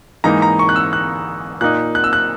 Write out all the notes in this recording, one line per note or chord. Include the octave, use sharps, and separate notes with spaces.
G#2 E3 A#3 D#4 A#5
A#5
C#6
F#6
E6
F#6
A#2 A#3 D#4 F#6
F#6
E6
F#6